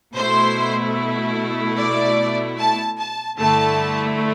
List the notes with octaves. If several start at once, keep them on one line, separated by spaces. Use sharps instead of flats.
B2 A3 E4 C5
D5
A5
A5
G2 D3 A3 E4 A5